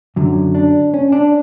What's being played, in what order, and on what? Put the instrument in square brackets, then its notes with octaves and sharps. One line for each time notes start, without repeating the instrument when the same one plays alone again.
[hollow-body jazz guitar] F#2 D3 F#3
D4
C#4
D4